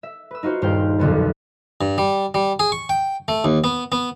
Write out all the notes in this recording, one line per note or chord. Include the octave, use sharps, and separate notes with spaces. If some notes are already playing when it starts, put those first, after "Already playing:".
E5
B4 E6
D#4 F4 F#4 C5
D#1 G2 C5 F5 G5
D#1 B1 F2 D3 B3 A6
G2
G3
G3
G#4
C#6
G5
A3
D#2
B3
B3